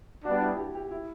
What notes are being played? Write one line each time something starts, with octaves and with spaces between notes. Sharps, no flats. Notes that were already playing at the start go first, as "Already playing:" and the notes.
G3 B3 D4 F#4
E4
F#4
G4
G4
E4